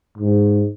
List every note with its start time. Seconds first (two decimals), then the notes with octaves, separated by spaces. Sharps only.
0.18 G#2